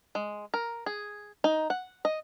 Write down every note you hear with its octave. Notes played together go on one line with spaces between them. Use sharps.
G#3
A#4
G#4
D#4
F#5
D#5